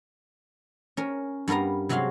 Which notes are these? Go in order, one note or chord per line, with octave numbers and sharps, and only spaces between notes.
C#4 A#4
G2 B3 A#4 F5 A#5
C3 F#3 G#3 F#4 F5 C6